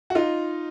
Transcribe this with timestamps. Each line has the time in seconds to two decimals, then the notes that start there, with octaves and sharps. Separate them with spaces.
0.10 F#4
0.15 D#4 F4